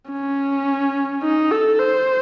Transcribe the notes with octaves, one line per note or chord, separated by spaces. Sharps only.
C#4
D#4
A4
C5